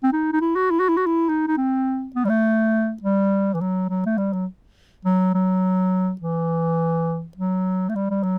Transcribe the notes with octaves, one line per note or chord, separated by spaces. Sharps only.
C4
D#4
D#4
E4
F#4
E4
F#4
E4
F#4
E4
D#4
D#4
C4
B3
G3
A3
G3
E3
F#3
F#3
A3
G3
F#3
F#3
F#3
E3
F#3
A3
G3
G3
F#3